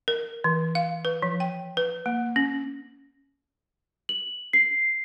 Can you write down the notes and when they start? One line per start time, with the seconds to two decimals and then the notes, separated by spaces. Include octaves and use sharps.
0.08 A#4
0.44 E3
0.75 F5
1.05 B4
1.22 F3
1.40 G5
1.77 B4
2.06 A#3
2.36 C#4
4.09 F#7
4.53 C7